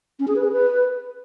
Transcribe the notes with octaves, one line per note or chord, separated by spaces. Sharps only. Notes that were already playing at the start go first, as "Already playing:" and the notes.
C#4
G#4
B4
G#4
B4